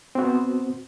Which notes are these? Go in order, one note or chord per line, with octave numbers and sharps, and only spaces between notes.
B3 C4 F#4 C5